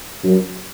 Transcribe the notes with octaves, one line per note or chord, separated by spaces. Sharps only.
F#2